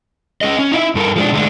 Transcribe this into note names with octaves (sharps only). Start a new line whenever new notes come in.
C#4 G#4 D#5
C#4
D#4 E4 E5
G2 A4 A#4
F3 G#3 D4
D3 G#3 A3 D4